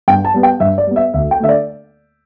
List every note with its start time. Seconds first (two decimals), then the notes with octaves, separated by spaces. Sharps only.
0.08 G2 G5
0.25 A5
0.34 G3 B3
0.43 G5
0.60 G2 E5
0.78 D5
0.87 G3 B3
0.96 E5
1.14 D2 E5
1.31 G5
1.40 D3 A3 E5
1.49 D5